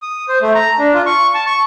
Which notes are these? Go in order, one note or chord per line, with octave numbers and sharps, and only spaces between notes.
D#6
C5
A3
A#5
D4
F4
C#6
A5
C#6